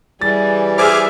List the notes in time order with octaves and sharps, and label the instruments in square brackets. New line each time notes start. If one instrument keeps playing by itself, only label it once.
[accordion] E3 G3 [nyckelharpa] G#4 [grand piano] A6
[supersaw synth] G#4 D6 F6 [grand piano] C5 [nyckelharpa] E5